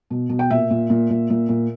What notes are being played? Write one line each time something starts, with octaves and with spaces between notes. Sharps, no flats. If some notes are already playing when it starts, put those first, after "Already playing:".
B2
B2
G5
A#2 E5
A#2
A#2
A#2
A#2
A#2